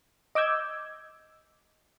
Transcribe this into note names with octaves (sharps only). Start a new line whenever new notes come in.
D#5 D6 E6 G6 G#6